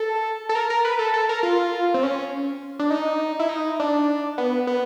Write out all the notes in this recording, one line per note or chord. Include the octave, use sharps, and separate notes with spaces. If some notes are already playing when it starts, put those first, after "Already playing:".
Already playing: A4
A4
A#4
A#4
B4
A4
A4
A#4
F4
C4
C#4
D4
D#4
E4
D#4
D4
B3
B3